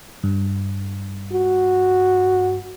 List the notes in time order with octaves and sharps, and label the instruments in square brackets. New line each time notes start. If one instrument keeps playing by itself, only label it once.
[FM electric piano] G2
[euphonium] F#4